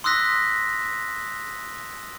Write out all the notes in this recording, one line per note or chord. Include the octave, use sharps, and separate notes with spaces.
C6 D#6 E6 F#6 A#6 B6